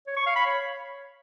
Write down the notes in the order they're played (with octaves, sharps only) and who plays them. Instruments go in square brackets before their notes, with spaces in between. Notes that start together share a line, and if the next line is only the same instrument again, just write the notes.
[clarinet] C#5
C#6
F5
B5
C#5